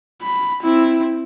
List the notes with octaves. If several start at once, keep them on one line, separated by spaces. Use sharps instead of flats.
B5
C4 E4